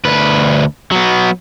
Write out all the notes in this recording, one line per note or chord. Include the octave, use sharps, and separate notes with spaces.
D2 B4
F#3 B3